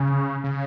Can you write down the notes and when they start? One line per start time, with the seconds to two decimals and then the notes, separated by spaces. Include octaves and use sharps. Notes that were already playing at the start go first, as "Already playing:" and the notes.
Already playing: C#3
0.44 C#3